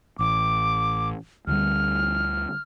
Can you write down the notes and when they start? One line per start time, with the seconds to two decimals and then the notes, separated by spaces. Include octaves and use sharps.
0.19 A1 D6
1.47 D2 D3 G3 F6